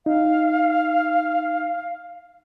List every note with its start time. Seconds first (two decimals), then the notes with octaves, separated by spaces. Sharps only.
0.06 D#4 F5